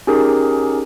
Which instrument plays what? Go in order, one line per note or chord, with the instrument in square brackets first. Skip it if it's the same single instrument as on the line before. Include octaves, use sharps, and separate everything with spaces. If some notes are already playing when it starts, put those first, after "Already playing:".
[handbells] C#4 D#4 G4 G#4 A#4